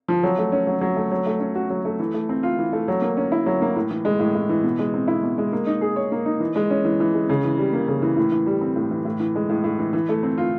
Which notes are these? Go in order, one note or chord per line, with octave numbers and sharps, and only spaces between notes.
F3
F#3
A3
C#4
F#3
F#3
A3
F#3
A3
C#4
F#4
F#3
A3
E3
A3
C4
F4
E3
A3
F#3
A#3
C#4
E4
F#3
A#3
A2
E3
G#3
A2
A2
E3
B2
G#3
C4
E4
B2
G#3
A#3
D#4
G#4
C#5
A#3
D#4
E3
G#3
C#4
E3
E3
G#3
C#3
E3
G3
A#3
C#3
E3
A2
E3
G3
C4
A2
E3
A2
E3
G#3
A2
A2
E3
E3
A3
C4
F4